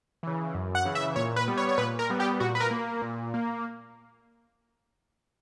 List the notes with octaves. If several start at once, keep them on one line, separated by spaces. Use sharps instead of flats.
C#3 E3
F#2
F#5
C#3 E3
E5
A#2 C#5
B4
G3 B3
C#5
C#5
A#2 B4
A#4
G3 B3
G4
A#2 F#4
B4
A#4
A#3
A#2
A#3